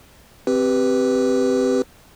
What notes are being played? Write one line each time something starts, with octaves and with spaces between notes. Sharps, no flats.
C4 G4 B4